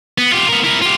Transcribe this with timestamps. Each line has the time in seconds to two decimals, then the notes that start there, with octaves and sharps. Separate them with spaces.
0.18 B3
0.33 F4 G4
0.48 B3 A#4
0.64 E4 A#4
0.81 F4 G4